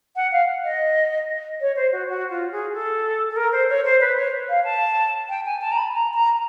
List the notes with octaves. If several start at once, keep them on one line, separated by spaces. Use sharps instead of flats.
F#5
F5
D#5
C#5
C5
F#4
F#4
F4
G#4
A4
A4
A#4
C5
C#5
C5
B4
C#5
F5
A5
G5
G#5
A5
A#5
B5
A#5
A#5